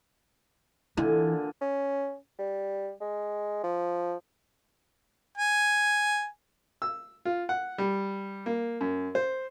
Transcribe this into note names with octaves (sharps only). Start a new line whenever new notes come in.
A#2 D3 E3 G#5
C#4
G3
G#3
F3
G#5
E6
F4
F#5
G3
A#3
F#2
C5